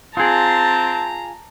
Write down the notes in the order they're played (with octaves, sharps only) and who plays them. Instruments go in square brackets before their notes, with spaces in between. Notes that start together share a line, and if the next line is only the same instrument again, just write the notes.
[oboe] C4 [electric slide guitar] F4 G#4 [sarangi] A5 [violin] A#5